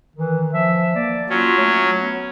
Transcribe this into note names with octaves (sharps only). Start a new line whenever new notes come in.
D#3 E3
F3 E5
A#3 D5
F#3 C#4 F4
A3 C#5
B3